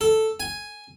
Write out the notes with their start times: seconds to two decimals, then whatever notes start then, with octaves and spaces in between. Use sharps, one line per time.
0.01 A4
0.40 G#5